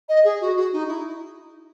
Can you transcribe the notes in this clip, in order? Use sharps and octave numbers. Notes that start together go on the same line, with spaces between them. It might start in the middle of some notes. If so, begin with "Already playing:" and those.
D#5
G#4
F#4
F#4
D#4
E4